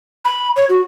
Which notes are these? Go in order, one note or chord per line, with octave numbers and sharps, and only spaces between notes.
B5
C#5
F#4